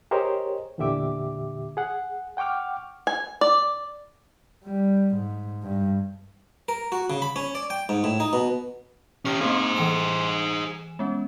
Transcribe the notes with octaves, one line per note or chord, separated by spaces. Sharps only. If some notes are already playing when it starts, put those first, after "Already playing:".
G4 G#4 A#4 C5 C#5 D#5
E2 A#2 D3 G4 E5 D6
G#4 F#5
F#5 G5 C#6 D6 F6
G#5
D5
G3
G#2
G2
A#4
F#4
C#3
B5
C#4
D5
G5
G#2
A2
D#4
B2
C#4 G4 C#6 F6
A#3 C4 G#4 C5
E3 G#5 E7
G#3 B3 C#4